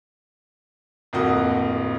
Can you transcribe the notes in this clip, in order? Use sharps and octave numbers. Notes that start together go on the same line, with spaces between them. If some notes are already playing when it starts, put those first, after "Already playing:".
D1 F2 A#3 F#4 D#5